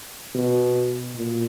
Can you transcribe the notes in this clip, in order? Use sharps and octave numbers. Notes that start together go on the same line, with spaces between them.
B2
A#2